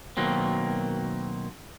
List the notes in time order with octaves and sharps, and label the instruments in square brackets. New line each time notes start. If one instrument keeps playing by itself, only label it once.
[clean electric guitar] B2 D#3 F#3 A#3 C4